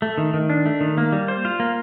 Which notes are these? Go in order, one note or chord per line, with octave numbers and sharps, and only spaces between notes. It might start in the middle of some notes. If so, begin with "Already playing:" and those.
A3
D#3
D#3
D4
A3
D#3
A#3
G3
C5
F4
A#3